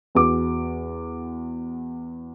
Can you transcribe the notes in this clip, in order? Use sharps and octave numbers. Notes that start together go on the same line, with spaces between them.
E2 F#4 D6